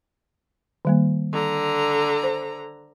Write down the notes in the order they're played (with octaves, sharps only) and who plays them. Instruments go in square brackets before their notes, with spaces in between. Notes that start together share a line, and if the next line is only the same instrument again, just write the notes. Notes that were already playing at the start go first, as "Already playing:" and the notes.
[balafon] D#3 G3 A#3
[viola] D3 A#5
[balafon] C5